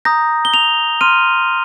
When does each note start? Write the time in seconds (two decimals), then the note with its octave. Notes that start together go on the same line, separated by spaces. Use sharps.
0.05 A#5 D#6 G6 A#6
0.45 G7
0.54 F7
1.01 C6 F6 D#7